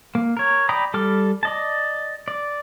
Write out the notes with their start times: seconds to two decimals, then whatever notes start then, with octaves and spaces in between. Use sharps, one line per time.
0.15 A#3
0.37 A#4 C#5
0.69 D5 G5 A#5 B5 D#6
0.94 G3 A4 D6 F6
1.43 D5 D#5 A5
2.28 D5